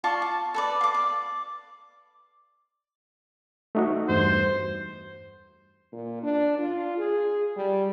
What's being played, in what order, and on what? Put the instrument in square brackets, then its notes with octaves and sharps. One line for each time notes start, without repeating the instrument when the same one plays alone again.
[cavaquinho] F4 D5 A5 C#6
A5
A4 B4 D5
F5 D6
D5
[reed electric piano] A3 D#4 F#4
[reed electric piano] E2 G2 [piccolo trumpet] C5
[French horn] A#2
D4
F4
G#4
G3